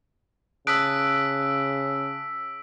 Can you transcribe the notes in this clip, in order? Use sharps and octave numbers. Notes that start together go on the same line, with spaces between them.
C#3 A5 D#6 E6 F#6 B6 D7